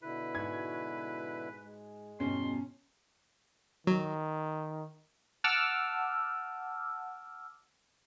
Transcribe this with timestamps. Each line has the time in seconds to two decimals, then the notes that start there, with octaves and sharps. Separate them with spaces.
0.03 B2 D3 E4 B4
0.35 G#2 F#4 G#6
1.64 G#3
2.20 E2 G2 B2 C#4 C6
3.87 D#3 F#3
5.44 F#5 A5 D6 E6 F6